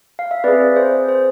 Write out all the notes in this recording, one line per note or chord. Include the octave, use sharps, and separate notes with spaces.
F5
E5
C4 G#4 B4 D5
C5
C5